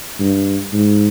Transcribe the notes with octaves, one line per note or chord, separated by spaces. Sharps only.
G2
G#2